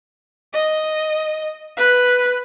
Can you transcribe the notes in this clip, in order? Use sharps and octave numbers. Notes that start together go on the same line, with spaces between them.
D#5
B4